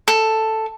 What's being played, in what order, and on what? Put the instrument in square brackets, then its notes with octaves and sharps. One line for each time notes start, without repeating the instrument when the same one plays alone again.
[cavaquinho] A4